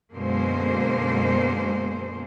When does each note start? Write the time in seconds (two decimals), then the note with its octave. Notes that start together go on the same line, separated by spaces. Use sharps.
0.14 F#2 B2 D3 G#3 A#3 C5